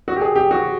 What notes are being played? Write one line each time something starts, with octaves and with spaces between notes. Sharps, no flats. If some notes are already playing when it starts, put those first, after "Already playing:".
F#4
G4
G#4
G4
F#4